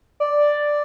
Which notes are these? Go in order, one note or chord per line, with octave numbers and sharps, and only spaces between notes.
D5